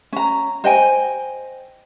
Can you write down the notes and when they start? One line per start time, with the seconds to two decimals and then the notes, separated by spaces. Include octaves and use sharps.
0.13 C#4 A#5
0.64 C5 D#5 G5 G#5